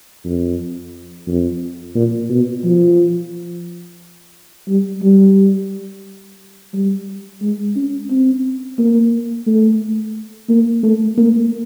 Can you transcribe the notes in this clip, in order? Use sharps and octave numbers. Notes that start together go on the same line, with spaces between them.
F2
F2
A#2
B2
F3
G3
G3
G3
G#3
C#4
C4
A#3
A3
A#3
A3
A#3